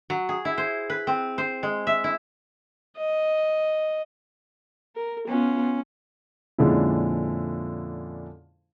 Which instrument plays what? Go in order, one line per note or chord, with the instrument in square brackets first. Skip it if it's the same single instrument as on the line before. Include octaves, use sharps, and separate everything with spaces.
[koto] F#3
G#4
E4
C5
B4
C4
C5
G#3
E5
E4
[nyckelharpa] D#5
[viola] A#4
[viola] B3 F4 [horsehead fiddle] C#4
[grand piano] F2 A#2 D3 G#3 C#4 E4